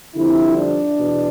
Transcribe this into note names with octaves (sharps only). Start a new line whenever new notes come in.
F2 D3 G3 C4 E4
D4
E2 B2